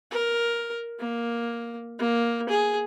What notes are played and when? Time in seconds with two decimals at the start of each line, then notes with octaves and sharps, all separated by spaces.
0.11 A#4
0.99 A#3
1.99 A#3
2.49 G#4